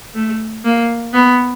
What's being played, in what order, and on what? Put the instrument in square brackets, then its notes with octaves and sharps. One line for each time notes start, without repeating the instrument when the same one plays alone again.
[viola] A3
A#3
B3